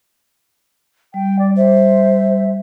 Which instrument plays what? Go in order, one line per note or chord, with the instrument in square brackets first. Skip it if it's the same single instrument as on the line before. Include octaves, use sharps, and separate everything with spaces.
[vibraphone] G3 [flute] G5
[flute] D5
[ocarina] C5 [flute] E5